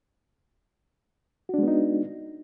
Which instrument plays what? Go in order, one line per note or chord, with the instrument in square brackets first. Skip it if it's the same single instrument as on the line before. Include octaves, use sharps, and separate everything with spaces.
[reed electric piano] F#4
D4
G#3
B3
D#4